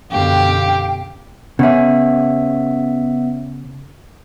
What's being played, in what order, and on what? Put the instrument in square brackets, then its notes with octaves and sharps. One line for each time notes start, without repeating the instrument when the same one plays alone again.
[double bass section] F#2 B2 D3 [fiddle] G4 [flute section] F5 G5
[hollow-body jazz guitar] C#3 C#4 [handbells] B3 E5